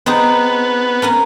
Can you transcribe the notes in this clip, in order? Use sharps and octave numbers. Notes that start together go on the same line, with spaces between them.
B3 C4 D#4 G#4
C#4 A#4 G#5